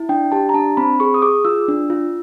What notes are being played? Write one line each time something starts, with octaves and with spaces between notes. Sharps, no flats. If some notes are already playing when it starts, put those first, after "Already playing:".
Already playing: E4
D4 G5
G4 A5
A#5
D4 A5
C4 B5
G#4 C#6
D#6
G#4 D6
F4 E6
D4
F4